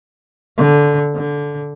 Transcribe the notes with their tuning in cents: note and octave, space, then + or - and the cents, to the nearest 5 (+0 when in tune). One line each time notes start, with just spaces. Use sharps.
D3 -10
D3 -15